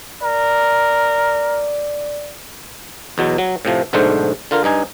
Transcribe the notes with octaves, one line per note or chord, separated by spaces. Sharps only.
A#4 D5
E2 B2 F#3
F#3
A2 C3 F3
B1 G#2 D3 A3 C5
D3 F4 A#4
G2 D#4 G#5